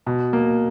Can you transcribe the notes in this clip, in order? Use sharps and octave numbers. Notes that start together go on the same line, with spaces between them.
B2
A#3